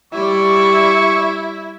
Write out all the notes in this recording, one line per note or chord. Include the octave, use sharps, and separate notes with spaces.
G3 E4 D5 C#6